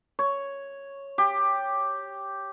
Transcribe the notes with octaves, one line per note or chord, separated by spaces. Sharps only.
C#5
G4